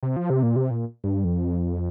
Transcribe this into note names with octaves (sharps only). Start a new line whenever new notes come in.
C3
F3
C3
A#2
C3
A#2
G2
F2